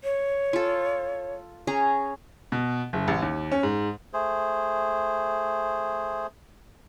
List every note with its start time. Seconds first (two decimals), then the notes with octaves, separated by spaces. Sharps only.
0.04 C#5
0.53 F4 A4
1.67 C#4 G#4 A#5
2.52 B2
2.93 F#1
3.08 A1
3.22 D#2
3.52 C#4
3.63 G#2
4.13 A3 G#4 C5